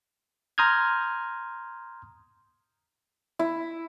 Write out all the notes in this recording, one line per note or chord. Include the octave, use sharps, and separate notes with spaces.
A#5 C6 D#6 F6 G6 G#6
E4